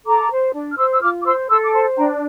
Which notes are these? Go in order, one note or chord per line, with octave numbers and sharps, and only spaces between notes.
A4 A#5 D6
C5
D4
F6
C5 C6 E6
E6
F4 D6 F6
D6
C5 C6 E6
A4 C6 E6
D6
C5 A5 C6
D4 G5 A#5